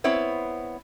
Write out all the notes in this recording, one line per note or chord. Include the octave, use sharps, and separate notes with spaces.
B3 C4 E4 C#5